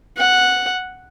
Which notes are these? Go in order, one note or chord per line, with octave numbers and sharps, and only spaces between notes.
F#5